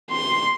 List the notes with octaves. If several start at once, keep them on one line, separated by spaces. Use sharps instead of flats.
C6